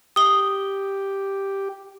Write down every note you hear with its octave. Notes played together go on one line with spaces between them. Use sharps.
G4 D#6 G7